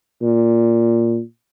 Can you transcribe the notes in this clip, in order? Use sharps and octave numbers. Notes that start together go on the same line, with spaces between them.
A#2